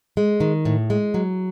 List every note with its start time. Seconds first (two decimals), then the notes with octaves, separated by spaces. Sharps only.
0.17 G#3
0.40 D#3
0.65 A2
0.90 G#3
1.14 F#3